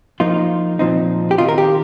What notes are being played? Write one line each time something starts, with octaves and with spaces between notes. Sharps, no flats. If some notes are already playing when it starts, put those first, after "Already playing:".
F3 A#3 D#4 F4
A#2 F3 C4 D#4
G4
D#3 C4 D#4 F4
A#4
G4